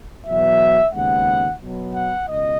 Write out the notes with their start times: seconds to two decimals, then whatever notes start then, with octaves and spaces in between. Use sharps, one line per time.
0.26 E2 B2 F#3 B3 E5
0.93 D#2 C#3 G#3 B3 F#5
1.61 B2 F#3 B3
1.95 F#5
2.28 C#2 B2 D#5